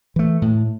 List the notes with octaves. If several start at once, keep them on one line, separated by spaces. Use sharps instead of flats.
E3 A3
A2